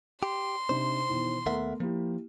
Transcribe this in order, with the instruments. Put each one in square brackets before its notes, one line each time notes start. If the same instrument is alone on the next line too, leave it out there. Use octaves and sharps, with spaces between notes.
[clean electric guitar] G4 [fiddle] C6
[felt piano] C3 D4 D#4 [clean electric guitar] C5
[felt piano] B2 D#3 E3
[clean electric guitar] D#2 E5 F#5 [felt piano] A3 B3 A#4
[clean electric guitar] F3 [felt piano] A#3 E4 G4